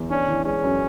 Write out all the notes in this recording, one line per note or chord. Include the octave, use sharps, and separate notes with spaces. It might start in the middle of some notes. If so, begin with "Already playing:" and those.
Already playing: E2
C#4 D4
E3
G#3 C#4
F#2